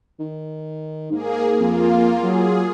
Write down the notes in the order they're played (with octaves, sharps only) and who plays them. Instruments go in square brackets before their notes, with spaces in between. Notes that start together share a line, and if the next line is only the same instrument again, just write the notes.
[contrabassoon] D#3
[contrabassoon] G#2 [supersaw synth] A#3 G#4
[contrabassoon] F2 [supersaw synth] A#3 F4
[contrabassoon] F#3 [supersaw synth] G#4